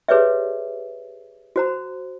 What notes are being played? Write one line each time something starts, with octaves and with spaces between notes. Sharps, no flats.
G4 G#4 B4 C#5 D5 E5
F#4 C5 A#5